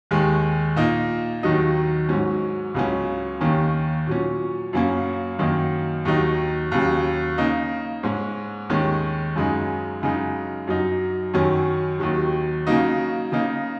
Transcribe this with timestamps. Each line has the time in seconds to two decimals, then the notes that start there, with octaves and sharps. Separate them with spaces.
0.11 D#2 D#3 G#3
0.76 A#2 A#3 D#4
1.43 D#2 D#3 F#3 D#4
2.09 G#2 F#3 C#4
2.74 C#2 C#3 F#3 C#4
3.41 D#2 D#3 A#3 C#4
4.07 A#2 F#3 C#4
4.73 F#2 C#3 A#3 C#4
5.39 F#2 D#3 A#3 D#4
6.05 D#2 D#3 F#3 D#4
6.72 D#2 C#3 F#3
7.38 C#3 A#3 D#4
8.03 G#2 G#3 C#4
8.70 D#2 D#3 G#3 C#4
9.36 F#2 C#3 G#3 D#4
10.02 F#2 C#3 G#3 D#4
10.67 F#2 F#3 D#4
11.34 F#2 D#3 F#3 C#4
12.00 D#2 D#3 F#3
12.67 C#3 F#3 A#3 D#4
13.32 C#3 A#3 D#4